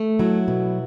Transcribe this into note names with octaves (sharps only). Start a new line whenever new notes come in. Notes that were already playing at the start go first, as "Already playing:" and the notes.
Already playing: A3
F#3 E4
B2